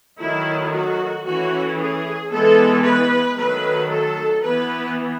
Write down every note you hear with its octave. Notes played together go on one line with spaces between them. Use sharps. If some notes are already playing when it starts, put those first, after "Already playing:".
D#3 F#3 A3 E4
F#4
E3 A3 C#4 F#4
G#4
E3 G#3 B3 A4
B4
D#3 F#3 A3 B4
A4
E3 B3 B4